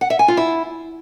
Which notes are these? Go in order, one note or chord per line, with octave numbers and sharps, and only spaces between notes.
F#5
E5
G#5
F4
E4